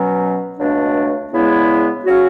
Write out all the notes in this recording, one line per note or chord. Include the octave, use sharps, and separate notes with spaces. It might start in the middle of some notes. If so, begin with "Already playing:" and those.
Already playing: B2 F#3 C#4
C#2 B2 A3 D4
E2 C#3 G#3 B3 E4
C#3 F#3 C#4 F#4